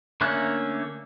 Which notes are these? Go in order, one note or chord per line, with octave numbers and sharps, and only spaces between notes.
D3 A3 A#3 C#4 F#6